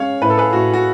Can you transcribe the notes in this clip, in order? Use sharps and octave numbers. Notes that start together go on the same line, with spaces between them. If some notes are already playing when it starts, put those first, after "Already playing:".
Already playing: G#3 C#4 C#5 F5
A2 B4
A4
G#4 B4
A2 F#4
F#4